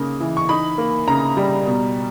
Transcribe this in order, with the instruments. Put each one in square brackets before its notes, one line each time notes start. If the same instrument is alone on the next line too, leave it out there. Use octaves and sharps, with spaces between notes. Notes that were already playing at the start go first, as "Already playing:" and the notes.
Already playing: [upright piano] C#3 A#3 D#4
E3
C#6
D#4 B5
A#3
C#3 A#5
G3
B2